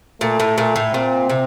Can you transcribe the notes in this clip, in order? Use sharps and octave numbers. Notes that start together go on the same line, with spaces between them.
A#2 A3
A2
A#2
A2
A#2 C4
C3